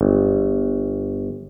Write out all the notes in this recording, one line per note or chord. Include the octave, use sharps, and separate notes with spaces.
G1